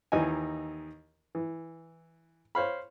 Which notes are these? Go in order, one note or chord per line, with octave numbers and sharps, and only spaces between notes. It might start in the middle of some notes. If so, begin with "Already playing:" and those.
D#2 E3 D#4 D#5 G#5
E3
C5 C#5 F5 B5